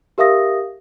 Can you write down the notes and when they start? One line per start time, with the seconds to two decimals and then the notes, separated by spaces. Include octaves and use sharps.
0.18 G4 A#4 E5 F5 D#6 A#6